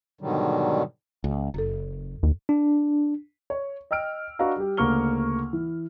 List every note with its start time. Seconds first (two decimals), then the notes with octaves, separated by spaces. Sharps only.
0.21 G#2 B2 D3 D#3 F#3 G3
1.24 C#2
1.54 F#1 F#2 A4
2.23 D#2
2.49 D4
3.50 C#5
3.91 D#5 G5 E6 F6 D7
4.39 D4 F#4 B4 D#5 F5 A#5
4.56 G3 G4
4.77 D2 C#3 A#3 C#6 F6 G7
5.53 E3